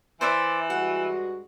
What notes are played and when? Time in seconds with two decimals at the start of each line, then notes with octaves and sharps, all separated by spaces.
0.21 E3 C5 D5 E5
0.70 G2 G#3 F#4 F#5